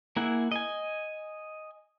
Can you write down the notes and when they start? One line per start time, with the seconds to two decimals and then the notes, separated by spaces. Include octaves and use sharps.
0.16 A#3 E4 G#4 F#5
0.52 D#5 G#5